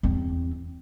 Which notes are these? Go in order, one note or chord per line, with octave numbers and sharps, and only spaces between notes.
E2 C4